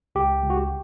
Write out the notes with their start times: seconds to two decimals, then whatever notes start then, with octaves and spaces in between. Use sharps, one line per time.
0.15 C#2 G4
0.43 C#2
0.50 F#4
0.57 G4